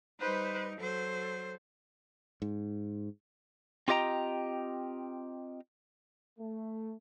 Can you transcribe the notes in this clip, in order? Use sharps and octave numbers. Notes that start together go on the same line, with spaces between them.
G3 D#4 B4 C5
F#3 A4 C5
G#2
C4 F4 G4 D#5 G5 A#5
A3